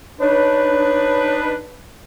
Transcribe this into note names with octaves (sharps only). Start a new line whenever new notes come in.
D4 D#4 B4 C#5